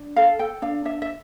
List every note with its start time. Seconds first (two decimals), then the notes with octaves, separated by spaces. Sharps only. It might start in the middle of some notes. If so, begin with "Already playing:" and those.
Already playing: D4
0.16 A4 F5
0.39 A4 G5
0.62 D4 F5
0.85 D4 E5
1.02 E5